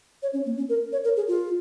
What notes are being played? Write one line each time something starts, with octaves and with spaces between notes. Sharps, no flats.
C#5
C#4
A#3
C#4
A#4
C#5
A#4
G#4
F4